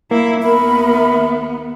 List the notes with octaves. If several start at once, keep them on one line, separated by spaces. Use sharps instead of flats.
A#3 E4
D#2 B3 A#4 E5 B5